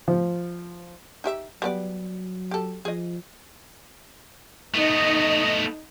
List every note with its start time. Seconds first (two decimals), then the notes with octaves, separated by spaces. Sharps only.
0.08 F3
1.24 D#4 G4 E5
1.62 F#3 G3 B3 D5
2.51 G4 A4
2.85 F3 G#4 D#5
4.74 A3 B3 D#4 D#5